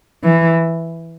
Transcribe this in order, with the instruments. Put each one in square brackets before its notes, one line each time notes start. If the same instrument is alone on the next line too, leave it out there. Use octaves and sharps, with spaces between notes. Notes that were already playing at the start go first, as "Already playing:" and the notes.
[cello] E3